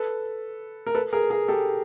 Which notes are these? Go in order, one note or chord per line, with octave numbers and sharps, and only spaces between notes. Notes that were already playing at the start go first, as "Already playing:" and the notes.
Already playing: A4 B4
A#4
A4 B4
G#4 A#4
G#4 A#4
G4 A4